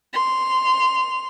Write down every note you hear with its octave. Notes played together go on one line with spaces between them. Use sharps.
C6 F7